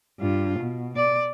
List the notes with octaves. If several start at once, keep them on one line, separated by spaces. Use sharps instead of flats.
G2 F4
B2
D5